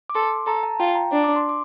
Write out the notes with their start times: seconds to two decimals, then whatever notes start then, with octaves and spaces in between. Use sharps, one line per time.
0.10 D6
0.15 A4 C6
0.47 A4 A#5
0.63 A5
0.79 F4 G5
0.95 A#5
1.12 D4
1.24 D6
1.36 C6
1.49 D6